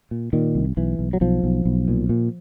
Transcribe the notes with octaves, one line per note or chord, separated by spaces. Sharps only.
A#2
A#2 D#3
C2
B1 E3
B1
F#3
B1 F3
B1
B1
A#2
A#2